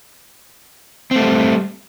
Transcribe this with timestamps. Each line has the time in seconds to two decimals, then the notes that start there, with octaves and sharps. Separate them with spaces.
1.11 C4
1.16 A3
1.21 G3